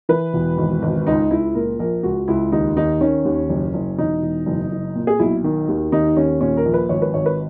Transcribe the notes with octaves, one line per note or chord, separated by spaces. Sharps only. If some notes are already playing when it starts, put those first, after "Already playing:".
E3 B4
E1
G#1
G#1
C#2 D#4
C#2 E4
A#2 A#4
A#1 A#4
C#2 F#4
C#2 E4
D#2 D#4
D#2 D#4
D#3 C#4
D#2
F#1
F#1
E1 D#4
E1
F#1
F#1
A#2
G#4
B1 E4
D#3
D#2
D#2 D#4
D#2 C#4
A#2 C#4
A#4
A#1
B4
G#1 C#5
B4
G#1 C#5
B4